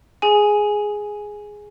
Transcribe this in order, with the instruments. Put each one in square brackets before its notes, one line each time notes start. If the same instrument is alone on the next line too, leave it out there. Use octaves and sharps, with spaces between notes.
[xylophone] G#4 G#5